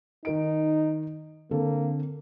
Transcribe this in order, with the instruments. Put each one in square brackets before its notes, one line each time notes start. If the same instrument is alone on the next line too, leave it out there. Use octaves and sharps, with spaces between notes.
[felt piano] D#3 A#4 D7 [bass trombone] D#4
[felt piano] D3 C4 A4 [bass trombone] A#3